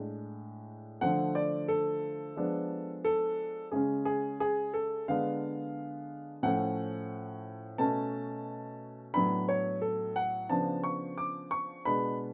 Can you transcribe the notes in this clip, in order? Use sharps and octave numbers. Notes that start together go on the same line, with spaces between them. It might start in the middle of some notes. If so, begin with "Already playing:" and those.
Already playing: A2 G#3 D4
D3 F3 A3 F#5
D5
A4
F3 G#3 B3 D4
A4
C#3 G#3 C#4 G#4
G#4
G#4
A4
D3 G#3 B3 D4 F5
A2 F3 A3 C#4 F#5
B2 A3 C#4 A5
A2 F#3 B3 D4 B5
C#5
A4
F#5
C#3 F3 B3 D4 A5
C#6
D6
C#6
B2 G#3 B3 D4 B5